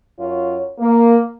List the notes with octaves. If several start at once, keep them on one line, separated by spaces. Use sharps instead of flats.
F#2 F4 C#5
A#3